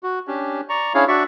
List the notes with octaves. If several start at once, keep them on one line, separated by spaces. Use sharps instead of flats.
F#4
C#4 D4 G4
D5 A#5 C#6
C#4 D4 E4 G#4 C#5 F5
D4 F#4 D5 E5 C#6